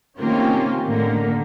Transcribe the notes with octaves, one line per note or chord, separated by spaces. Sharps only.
C3 D#3 A#3 C#4 F4 G4
A2 D3 D#3 A#3